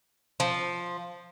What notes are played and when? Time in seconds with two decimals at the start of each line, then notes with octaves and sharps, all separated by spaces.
0.40 F3